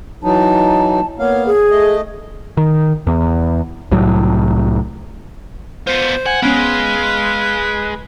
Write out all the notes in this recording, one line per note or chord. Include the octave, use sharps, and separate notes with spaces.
E3 F#3 D#4 A5
A#3 B3 C#5 F5
G#4
A3 D#5
D#3
E2
C2 A2 F#3
B3 F4 C5
F#5 G#5
G#3 B3 C#4 B4 F5